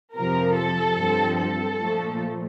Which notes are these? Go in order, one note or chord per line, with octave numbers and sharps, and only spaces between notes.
F2 C3 F3 A#4
A4
G2 F3 C4
A4
A#2 F3 A3